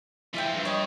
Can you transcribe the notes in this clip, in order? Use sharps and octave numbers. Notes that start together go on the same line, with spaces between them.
E3 F3 F4 E5 G5
G2
C#5 D#5